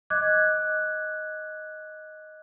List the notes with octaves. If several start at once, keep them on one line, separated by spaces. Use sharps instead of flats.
D#5 D6 F#6 G#6